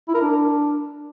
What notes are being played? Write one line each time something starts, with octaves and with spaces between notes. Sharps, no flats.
E4
A#4
D4